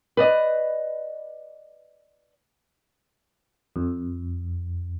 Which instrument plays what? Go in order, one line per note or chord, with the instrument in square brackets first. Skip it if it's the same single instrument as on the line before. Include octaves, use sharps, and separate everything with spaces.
[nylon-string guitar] B4 D5 D#5
[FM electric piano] F2